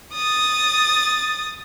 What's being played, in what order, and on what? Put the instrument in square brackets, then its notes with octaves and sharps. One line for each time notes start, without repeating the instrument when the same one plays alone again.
[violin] D#6 A6